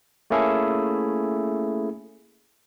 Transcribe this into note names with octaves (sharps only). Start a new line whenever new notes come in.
A3 A#3 C#4 E4 G#4 A4